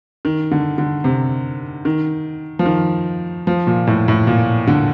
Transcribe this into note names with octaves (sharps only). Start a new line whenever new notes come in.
D#3
D3
D3
C3
D#3
F3
D#3
F3
A#2
A2
A2
A#2
D3